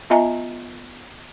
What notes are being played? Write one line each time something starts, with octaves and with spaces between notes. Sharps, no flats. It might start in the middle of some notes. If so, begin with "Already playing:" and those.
B3 F4 D#5 E5 G#5 A#5